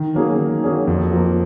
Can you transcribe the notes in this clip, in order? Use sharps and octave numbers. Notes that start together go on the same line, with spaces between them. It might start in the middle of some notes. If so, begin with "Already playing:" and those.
Already playing: D#3
F#3 A#3 C#4 G#4
D#3
F#3 A#3 C#4 G#4
F2
F3 A#3